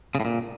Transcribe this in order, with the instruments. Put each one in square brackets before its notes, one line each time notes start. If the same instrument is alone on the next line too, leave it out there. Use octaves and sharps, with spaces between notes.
[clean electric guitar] C#3
A2
A#2